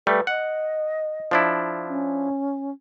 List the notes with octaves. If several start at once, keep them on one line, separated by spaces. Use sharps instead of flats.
G3 A3 B4
D#5 F#5
F3 D4 E4
C#4